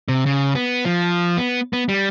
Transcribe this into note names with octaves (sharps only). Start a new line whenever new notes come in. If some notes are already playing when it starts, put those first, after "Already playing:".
C3
C#3
B3
F3
B3
B3
G3